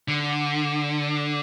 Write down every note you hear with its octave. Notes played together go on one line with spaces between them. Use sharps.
D3